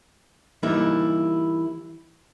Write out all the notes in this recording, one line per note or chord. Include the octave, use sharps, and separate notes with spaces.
E3 G3 A#3 D#4 E4